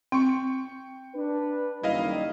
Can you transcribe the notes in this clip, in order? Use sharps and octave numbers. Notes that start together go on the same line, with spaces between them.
C4 G5 C#6
D4 B4
F#1 D#3 G3 E4 D#5 F5